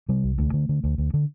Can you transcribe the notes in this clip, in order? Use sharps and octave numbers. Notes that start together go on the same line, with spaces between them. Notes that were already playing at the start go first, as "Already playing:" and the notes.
C3 G3
C2
D2 A3
D3
D3
D2
D2
D3